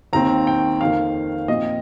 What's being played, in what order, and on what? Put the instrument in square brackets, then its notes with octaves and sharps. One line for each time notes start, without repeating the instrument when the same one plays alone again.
[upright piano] D#2 D#3 C4 A#5
G5
F2 D#3 A#3 F5
A#2 F3 C4 D#5